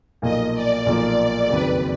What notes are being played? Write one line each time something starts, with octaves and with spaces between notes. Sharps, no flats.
B1 A#2 F3 A#3 D#5
D5
B1 A#2 F3 A#3
F#1 F2 D#3 F#3 B4